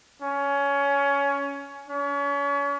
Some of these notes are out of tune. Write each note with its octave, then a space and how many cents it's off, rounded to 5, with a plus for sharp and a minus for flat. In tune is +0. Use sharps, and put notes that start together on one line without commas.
C#4 +20
C#4 +35